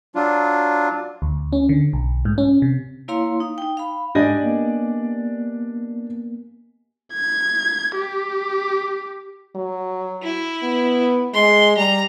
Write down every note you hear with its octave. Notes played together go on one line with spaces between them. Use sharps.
F#3 D4 F4
D2
C#4
D3
B1
G#2
C#4
C3
A#3 E4 C#5 F5 A#5 C6
D#4
D#4 G5
F5 B5
G#2 D4 G4 D5 D#5 G#5
A#3 B3
G#6
G4
F#3
E4
B3
G#3 C6
G3 A#5